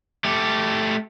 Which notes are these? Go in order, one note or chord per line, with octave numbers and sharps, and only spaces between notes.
A3 G4